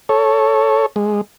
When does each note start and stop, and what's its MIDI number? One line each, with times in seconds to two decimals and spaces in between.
0.09 0.86 69
0.09 0.86 73
0.96 1.21 56